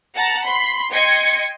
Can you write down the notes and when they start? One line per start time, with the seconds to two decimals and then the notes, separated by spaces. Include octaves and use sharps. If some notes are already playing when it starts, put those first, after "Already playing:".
0.14 F#5 A5 A#5
0.44 B5 C6
0.90 D#5 G5 C6 G#6 C#7